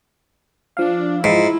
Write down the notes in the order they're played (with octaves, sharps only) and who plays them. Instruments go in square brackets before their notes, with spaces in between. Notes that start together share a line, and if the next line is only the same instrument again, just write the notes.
[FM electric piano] F3 F5 [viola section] D4
[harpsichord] G#2 [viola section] E4 F4